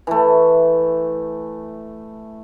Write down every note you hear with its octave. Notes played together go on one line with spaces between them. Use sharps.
E3 A3